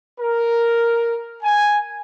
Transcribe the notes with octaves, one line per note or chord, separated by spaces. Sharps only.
A#4
G#5